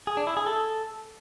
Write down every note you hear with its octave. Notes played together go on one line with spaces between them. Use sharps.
G#4
D4
E4
G#4
A4